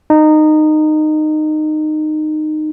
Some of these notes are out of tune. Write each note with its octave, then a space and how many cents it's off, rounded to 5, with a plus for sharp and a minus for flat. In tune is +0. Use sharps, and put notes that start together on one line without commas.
D#4 -20